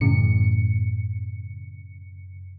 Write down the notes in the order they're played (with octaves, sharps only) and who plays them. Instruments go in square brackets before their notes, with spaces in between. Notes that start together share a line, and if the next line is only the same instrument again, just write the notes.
[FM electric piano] F#2 C#3 C#7 [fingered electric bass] A2 E3